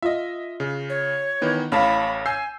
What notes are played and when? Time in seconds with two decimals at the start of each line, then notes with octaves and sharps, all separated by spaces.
0.02 F4 D#5 E5
0.60 C#3
0.89 C#5
1.41 D#3 E3 B3
1.72 A1 A2 C#4 F5 A5 B5
2.26 G#5 E6 G6 C7